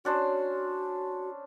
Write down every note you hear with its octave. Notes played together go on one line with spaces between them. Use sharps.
C#4 D4 F#4 C5